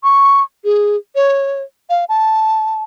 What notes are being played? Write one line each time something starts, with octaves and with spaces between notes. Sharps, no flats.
C#6
G#4
C#5
F5
A5